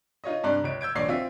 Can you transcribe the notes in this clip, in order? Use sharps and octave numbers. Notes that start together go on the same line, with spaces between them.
D#4 F4 C#5 D#5
G2 C3 D5 A#5 F#6
C#2 C#5 D7
E6 G6 G#6 D7
D#1 A#1 C#5 D5 C7
C4 F4 E5